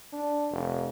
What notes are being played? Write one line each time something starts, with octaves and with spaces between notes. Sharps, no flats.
D4
F1